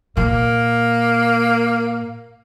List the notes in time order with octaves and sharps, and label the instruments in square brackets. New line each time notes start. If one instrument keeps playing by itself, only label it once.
[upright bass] A#2 [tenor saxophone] A#3